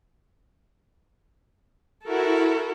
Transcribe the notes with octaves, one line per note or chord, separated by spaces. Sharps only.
E4 F#4 A4 A#4